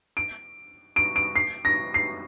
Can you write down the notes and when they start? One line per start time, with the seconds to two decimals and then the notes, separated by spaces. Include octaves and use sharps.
0.17 D7
0.96 D7
1.16 D7
1.36 C7
1.65 A#6
1.94 C7